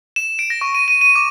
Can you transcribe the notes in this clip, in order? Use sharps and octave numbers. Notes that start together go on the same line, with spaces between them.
E7
D7
A#6
C#6
D#7
D#7
D#7
D6